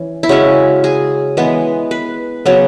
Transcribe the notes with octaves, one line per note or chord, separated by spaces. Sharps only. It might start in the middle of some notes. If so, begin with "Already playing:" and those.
Already playing: E3 C#4
E4
C#3 G#3 C#4 F#4
G#4
E3 G#3 B3
B4
C#3 F#3 B3